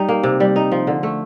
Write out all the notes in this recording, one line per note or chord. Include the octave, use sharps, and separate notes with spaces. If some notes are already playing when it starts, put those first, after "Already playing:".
Already playing: G3 D#4
A#3
C3
G3
D#4
F3
D3
A3